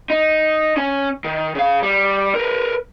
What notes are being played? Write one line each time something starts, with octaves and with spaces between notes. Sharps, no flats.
D#4
C#4 G#5
D#3
C#3 F5
G3
A#4 B4